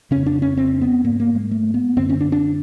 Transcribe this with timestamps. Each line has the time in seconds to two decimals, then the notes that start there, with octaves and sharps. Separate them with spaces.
0.11 F2 C#3 C#4
0.26 D4
0.42 C#4
0.57 C4
0.81 B3
1.04 G#2 A#3
1.20 A#3
1.35 G#3
1.51 A3
1.74 B3
1.97 F#2 D3 C4
2.09 C#4
2.21 D4
2.32 D4